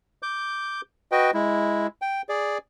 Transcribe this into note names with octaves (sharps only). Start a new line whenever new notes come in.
D6 G6
F#4 B4 D#5 G5
G#3 E4
G5
G#4 D5